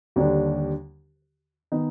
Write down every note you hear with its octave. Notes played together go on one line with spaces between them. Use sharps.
D#2 D3 G3 D4
D#3 B3 D#4